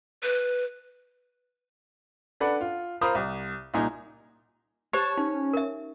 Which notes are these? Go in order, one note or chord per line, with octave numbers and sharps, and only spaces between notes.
B4
D4 A4 B4 D5 F#5
F4
F4 A#4 C5 A#5 B5 D#6
C2
C2 A#2 D#4 G#5 A#5
G4 C5 C#5 A5
C#4 D#4
A#4 E5